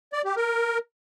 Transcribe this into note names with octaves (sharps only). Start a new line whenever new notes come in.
D5
G4
A#4